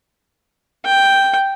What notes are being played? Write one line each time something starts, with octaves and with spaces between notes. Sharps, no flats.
G5